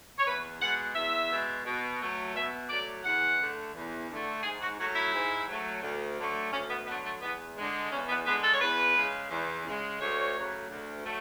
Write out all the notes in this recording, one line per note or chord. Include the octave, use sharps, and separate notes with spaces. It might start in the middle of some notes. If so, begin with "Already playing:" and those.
C#5
E2 B4
B2 G#3 F#5
E2 E5
B2 G#3
B2
F#3 A3
B2 E5
F#3 A3 D5
E2 F#5
D3 A3
E2
D3 A3
G#2 G#4
F#4
F#3 A3 F#4
E4
G#2
F#3 A3
D2
D3 F#3 A3
D2 C#4
B3
D3 F#3 A3 B3
A3
E2 B3
D3 G#3
E2 C#4
B3
D3 G#3 B3
A4
C#5
E2 B4
C#3 G#3
E2
C#3 G#3
D2 C#5
C#3 F#3 A3
D2
F#3 A3